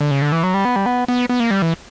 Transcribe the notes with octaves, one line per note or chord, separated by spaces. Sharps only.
D3
C#3
D3
E3
F#3
G3
B3
G3
B3
B3
B3
A#3
G3
E3